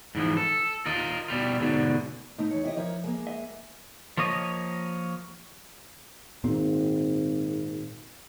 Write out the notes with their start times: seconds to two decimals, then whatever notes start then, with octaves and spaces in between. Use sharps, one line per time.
0.15 G#2 E3 F3
0.37 A4
0.86 F4 A#4 D#5
1.28 B2 G3 F4
1.60 G#2 B2 D3
2.38 A2 A3 D#4
2.51 E2 C#5
2.64 E4 G4 D#5
2.77 F3 E4 A#4 C#5
3.04 G#3 A#3
3.27 D#5 E5
4.17 F3 A#3 C#5 D#5
6.44 G#1 A#2 C4